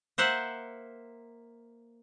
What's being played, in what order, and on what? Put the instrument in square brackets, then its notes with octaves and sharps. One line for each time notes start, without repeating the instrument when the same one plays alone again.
[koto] A#3 C5 E5 F#5